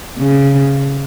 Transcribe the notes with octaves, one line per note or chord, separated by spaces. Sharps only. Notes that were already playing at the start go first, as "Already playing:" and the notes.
C#3